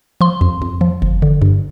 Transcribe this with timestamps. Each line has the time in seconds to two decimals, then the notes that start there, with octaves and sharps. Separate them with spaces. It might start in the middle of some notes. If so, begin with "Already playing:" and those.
0.21 F3 C6
0.41 F2
0.62 F2
0.81 F3
1.02 G1
1.22 D3
1.42 G2